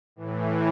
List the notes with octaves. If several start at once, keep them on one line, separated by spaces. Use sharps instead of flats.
A2 E3